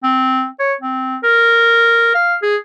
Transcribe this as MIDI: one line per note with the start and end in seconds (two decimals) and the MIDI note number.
0.04 0.46 60
0.60 0.74 73
0.81 1.17 60
1.24 2.13 70
2.15 2.35 77
2.43 2.56 68